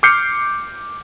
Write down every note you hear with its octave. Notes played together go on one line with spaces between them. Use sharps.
D6 F6 G6 C7 C#7